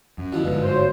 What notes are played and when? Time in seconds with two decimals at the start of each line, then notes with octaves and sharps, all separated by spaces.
0.18 F#2
0.33 D2 B2 F3 E4
0.45 G1 G#2 B4
0.62 F4 F#4 C5
0.75 C#5